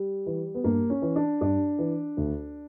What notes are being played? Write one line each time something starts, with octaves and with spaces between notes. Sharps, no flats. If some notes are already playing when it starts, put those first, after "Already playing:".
Already playing: G3
E3
B3
G2 A#3
C#4
E3
D4
G2 D4
E3
D2